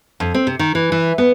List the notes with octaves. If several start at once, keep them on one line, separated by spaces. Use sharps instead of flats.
F2
C4
C3
D#3
E3
E3
B3